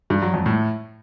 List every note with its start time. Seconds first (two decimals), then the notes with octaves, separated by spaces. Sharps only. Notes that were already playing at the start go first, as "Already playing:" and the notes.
0.10 G2
0.22 F#3
0.34 F2
0.46 A2